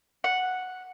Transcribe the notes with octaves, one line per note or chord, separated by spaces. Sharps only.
F#5